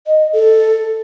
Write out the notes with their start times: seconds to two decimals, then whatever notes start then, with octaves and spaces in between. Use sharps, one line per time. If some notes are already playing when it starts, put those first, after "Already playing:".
0.07 D#5
0.33 A4